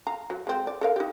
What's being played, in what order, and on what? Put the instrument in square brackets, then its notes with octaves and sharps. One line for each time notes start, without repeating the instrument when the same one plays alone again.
[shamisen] F5 A#5
F#3
G#3 C4
D5
A4 A#4 F5
D#4 G4